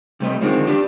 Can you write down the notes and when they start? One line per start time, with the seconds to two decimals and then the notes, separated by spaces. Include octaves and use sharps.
0.20 C3 G3 A3 B4 D#5
0.41 D3 D#3 F3 G#3 C4
0.67 D4 G4 B4 D5